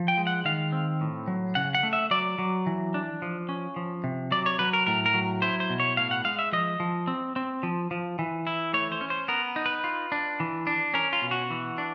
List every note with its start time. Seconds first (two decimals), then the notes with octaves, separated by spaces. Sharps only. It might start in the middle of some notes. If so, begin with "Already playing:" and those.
Already playing: F3
0.08 G5
0.17 G#3
0.27 F#5
0.45 D#3 F5
0.72 C4
1.01 A2
1.28 F#3
1.55 C#3 F#5
1.75 F#5
1.83 A3
1.93 E5
2.11 F#3 D5
2.39 F#3
2.66 E3
2.94 D4
3.22 F3
3.49 C#4
3.76 F3
4.04 C3
4.31 F#3 D5
4.46 C#5
4.59 F#3 B4
4.73 A#4
4.87 A2 A#4
5.06 A#4
5.14 F#3
5.42 E4 C5
5.60 C5
5.70 B2
5.80 C#5
5.97 A2 F5
6.11 F#5
6.25 G#3 F5
6.39 E5
6.52 F3 D#5
6.80 F3
7.07 C4
7.36 C4
7.63 F3
7.91 F3
8.19 E3
8.47 E4
8.73 A3 C#5
8.92 C5
9.01 C#4
9.10 C5
9.28 B3 A#4
9.56 D#4
9.66 B4
9.84 F4
10.12 D4
10.40 E3
10.67 D4
10.94 C#4 A#4
11.13 F4
11.22 B2
11.31 F#4
11.50 E3
11.78 D4